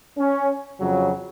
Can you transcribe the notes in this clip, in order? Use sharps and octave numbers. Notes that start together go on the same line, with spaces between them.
C#4
F2 C#3 F#3